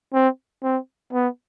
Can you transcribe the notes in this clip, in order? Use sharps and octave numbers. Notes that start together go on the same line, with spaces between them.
C4
C4
B3